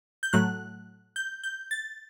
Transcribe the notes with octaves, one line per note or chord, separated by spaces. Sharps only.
G6
A2 F#3 A3 F#6
G6
G6
A6